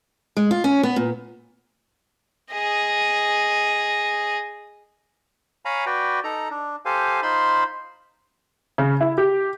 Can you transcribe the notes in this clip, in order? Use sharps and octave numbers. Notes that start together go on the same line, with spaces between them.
G#3
F4
C#4
B3
A#2
G#4 D#5
C#5 F5 G#5 A#5 B5
F#4 B4 D5 G5
D#4 A4 A#5
D4
G4 A4 C5 F5 G#5
D#4 F4 C5 B5 C6
C#3
E4
G4